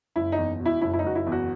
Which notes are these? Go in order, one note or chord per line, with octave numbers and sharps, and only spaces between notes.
F#1 E4
D#4
E2
B2
E4
F#1 E4
E4
D#4
F#1 F#4
E4
E2
F#4